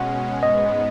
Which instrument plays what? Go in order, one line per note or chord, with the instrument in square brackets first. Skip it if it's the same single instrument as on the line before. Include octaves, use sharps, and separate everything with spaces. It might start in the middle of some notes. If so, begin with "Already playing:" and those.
Already playing: [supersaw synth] B2 G#3 C#4 [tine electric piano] F#5
[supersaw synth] G#2 G#3 B3 [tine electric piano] D#5